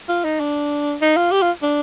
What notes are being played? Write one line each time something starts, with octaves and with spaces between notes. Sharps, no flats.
F4
D#4
D4
D#4
F4
G4
F4
D4